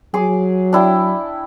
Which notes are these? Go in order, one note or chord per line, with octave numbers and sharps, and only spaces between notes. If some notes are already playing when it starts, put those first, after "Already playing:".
F#3 G#4 D6
D4 E4 G5